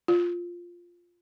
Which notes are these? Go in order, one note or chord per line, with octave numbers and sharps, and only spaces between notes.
F4